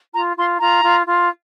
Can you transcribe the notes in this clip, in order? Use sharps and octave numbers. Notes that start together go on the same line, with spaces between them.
F4 A#5
F4 C6
F4 A#5
F4
F4